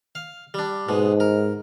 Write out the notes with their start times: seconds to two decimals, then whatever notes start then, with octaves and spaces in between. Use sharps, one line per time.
0.15 F5
0.54 G3 D4
0.89 G#2 B2 G#3
1.20 A#4